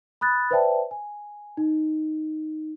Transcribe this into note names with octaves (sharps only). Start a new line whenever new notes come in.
B5 D#6 F#6 A6
B4 C5 D5 E5 G5 A5
G#5
D#4